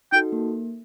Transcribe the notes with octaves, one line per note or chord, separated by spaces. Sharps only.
D#4 F#4 A4 G5
A#3